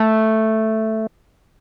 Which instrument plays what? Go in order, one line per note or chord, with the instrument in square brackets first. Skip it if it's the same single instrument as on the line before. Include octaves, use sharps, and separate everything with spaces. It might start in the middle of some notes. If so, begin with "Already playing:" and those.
Already playing: [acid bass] A3